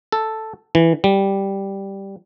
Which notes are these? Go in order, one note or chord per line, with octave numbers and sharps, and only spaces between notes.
A4
E3
G3